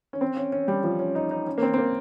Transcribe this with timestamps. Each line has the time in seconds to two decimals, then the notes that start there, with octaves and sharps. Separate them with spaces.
0.13 C#4
0.21 C4
0.37 C#4
0.52 C#4
0.68 G3
0.84 F3
0.99 C#4
1.15 D#4
1.31 D#4
1.47 C#4
1.58 A#3
1.62 C4
1.74 C4
1.78 A#3